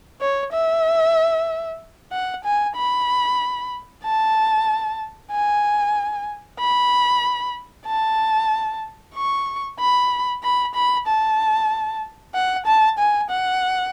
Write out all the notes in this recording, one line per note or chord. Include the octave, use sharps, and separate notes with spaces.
C#5
E5
F#5
G#5
B5
A5
G#5
B5
A5
C#6
B5
B5
B5
A5
F#5
A5
G#5
F#5